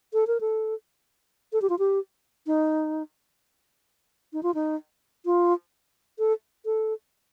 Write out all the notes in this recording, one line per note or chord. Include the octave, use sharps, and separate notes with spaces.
A4
A#4
A4
A4
G4
F4
G4
D#4
D#4
F4
D#4
F4
A4
A4